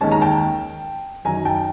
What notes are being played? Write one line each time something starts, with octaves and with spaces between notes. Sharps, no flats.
D#2 D#3 G#3 C#4 A5
A#5
G5 A5
F#2 D#3 F#3 G#5 A#5
G5 A5